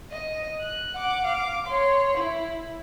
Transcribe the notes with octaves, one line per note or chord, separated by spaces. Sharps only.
D#5
F#6
F#5 D6
F5 D6
C#5 C6
E4